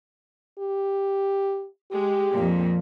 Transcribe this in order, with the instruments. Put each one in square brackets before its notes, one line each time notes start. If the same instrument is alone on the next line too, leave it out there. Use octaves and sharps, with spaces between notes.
[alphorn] G4
[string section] G#3 [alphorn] G4
[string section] F2 A#2